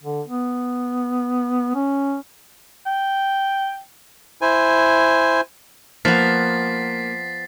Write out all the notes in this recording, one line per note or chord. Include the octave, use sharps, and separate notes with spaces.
D3
B3
C#4
G5
E4 C5 G#5
F3 A#3 B3 A6 B6 C7